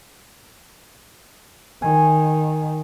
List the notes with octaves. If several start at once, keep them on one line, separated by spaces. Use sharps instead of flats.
D#3 G#5